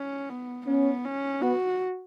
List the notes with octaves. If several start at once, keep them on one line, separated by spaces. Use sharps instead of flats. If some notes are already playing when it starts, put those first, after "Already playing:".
Already playing: C#4
B3
B3 C#4
C#4
B3 F#4